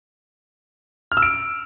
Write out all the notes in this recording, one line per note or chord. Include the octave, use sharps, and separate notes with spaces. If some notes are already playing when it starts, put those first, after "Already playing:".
F6
E6
D7